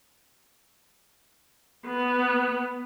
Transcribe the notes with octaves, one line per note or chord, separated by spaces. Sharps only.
B3